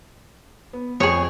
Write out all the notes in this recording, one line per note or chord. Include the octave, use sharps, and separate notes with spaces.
B3
F2 G#4 C#5 C#6